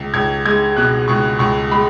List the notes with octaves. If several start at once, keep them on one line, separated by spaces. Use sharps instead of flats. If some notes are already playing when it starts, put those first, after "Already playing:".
Already playing: C#2
C#2 G#6
G#3 G#6
B2 F#6
C#2 C#6
C#2 C#6
G#3 B5